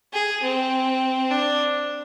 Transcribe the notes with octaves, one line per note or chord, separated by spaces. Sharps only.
G#4
C4
D4